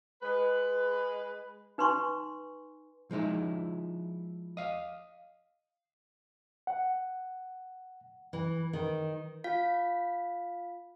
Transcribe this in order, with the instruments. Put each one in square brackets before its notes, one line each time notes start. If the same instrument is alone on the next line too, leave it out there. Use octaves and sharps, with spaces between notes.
[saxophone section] G#3 B4
[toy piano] D#4 B4 G#5 C6 C#6
[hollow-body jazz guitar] F3 G#3 D#4 E4
D#5 F5
[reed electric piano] F#5
[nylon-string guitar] E3
D#3
[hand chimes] F4 F5 B6